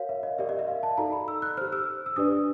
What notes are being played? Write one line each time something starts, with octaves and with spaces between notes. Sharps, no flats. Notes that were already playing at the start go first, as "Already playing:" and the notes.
Already playing: F#4 A#4 C#5 F5
E5
D#5
G4 A#4 D5 E5
D#5
E5
F5
A5
D#4 F#4 A4 D5 A#5
B5
E6
F#6
G4 C5 F6
E6
E6
D4 G4 B4 D5 D#6